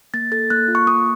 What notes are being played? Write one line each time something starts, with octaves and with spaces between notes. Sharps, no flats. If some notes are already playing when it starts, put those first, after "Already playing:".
A#3 A6
A4 A6
A#3 F#6
F4
C#6
A#3 D#6